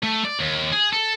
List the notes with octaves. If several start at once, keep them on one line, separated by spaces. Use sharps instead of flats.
A3
D5
D#2
G#4
A4